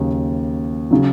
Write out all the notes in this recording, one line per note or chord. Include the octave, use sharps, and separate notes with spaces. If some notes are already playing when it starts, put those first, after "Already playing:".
Already playing: D#2 C#3 F#3
C#3 F#3